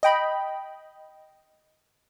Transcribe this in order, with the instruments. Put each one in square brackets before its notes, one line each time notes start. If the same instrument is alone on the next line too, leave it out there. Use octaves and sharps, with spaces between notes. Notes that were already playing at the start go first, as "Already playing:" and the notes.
[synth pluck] D#5 G5 B5